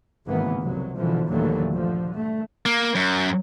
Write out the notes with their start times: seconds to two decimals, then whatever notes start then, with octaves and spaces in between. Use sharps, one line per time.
0.26 G#1 C#3 E3 A#3 B3
0.61 C2 F2 F#3
0.96 B2 D3 E3 F3
1.28 D#2 A#2 D3 E3 F#3 A3
1.74 G2 D3 F3
2.15 A3
2.66 A#3
2.95 F#2